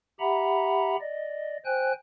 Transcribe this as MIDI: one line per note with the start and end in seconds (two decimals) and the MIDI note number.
0.20 0.96 67
0.20 0.96 76
0.20 0.96 78
0.20 0.96 82
0.20 0.96 83
1.01 1.57 74
1.01 1.57 75
1.65 1.93 72
1.65 1.93 79
1.65 1.93 80
1.65 1.93 90